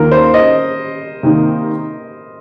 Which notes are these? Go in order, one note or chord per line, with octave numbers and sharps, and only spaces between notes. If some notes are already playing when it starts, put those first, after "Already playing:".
Already playing: D#2 D#3 A#3 F4 A#4
C5
D#5
C3 D#3 A#3 D#4